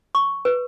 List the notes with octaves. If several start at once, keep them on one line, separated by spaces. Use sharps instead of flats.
C#6
B4